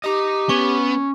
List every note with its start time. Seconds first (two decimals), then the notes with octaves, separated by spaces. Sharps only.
0.04 G4 D#5 A#5
0.49 B3 C#4 C#6